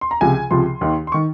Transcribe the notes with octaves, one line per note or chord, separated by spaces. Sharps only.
C6
A#5
C#2 C3 F3 G#5
C#2 C3 F3 C6
D#2 D#3
C6
D#3 C#6